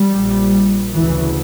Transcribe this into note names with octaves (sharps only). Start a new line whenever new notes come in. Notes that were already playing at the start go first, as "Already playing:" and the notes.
Already playing: G3
A#1 A#2
D2 C#3 E3